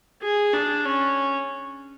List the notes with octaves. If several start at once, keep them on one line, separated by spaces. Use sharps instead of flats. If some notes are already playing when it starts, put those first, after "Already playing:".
G#4
D4
C#4